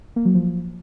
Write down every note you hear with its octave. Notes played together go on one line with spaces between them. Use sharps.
A#3
F#3
F3